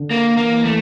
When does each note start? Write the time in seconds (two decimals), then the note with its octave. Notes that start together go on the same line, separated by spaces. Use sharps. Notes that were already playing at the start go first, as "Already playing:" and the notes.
Already playing: D3
0.11 A#3
0.37 E3 A#3
0.64 A3